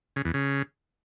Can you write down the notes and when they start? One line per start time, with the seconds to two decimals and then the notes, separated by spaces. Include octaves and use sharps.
0.16 C#3
0.25 E2
0.34 C#3